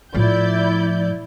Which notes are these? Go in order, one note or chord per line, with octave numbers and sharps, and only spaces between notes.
A2 F3 E4 D5 G6